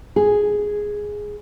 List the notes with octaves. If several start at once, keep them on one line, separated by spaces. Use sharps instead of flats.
G#4